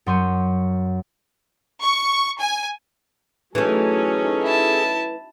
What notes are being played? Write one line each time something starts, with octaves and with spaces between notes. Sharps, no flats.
F#2 F#3 C6 C#6 G6 D#7
C#6
G#5
E3 F#3 A3 C#4 D#4 G#4 A4
E4 A5